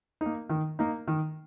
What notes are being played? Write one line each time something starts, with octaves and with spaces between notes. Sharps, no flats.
A#3 D#4
D#3
A#3 D#4
D#3